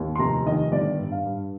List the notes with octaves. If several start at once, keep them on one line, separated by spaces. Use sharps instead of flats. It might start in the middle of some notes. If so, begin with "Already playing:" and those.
Already playing: D#2
C6
F1 A#5
D#3 D#5
G1 D5
G2
F5
G2